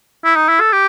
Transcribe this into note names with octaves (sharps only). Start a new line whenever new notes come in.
E4
D#4
E4
A4
G4